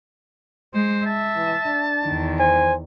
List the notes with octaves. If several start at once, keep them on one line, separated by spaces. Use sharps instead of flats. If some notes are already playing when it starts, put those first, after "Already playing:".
G#3 C5
E5 A5
E3
D4
E2 D#3
C5 G#5